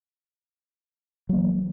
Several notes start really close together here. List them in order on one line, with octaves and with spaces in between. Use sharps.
F#3 A#3 E3